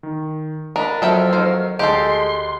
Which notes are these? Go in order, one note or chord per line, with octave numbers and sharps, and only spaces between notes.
D#3
D4 A#4 D#5 B5
F2 F#3 A4 E5 G5 F6
D#3 C5
D2 G#3 G4 A4 C6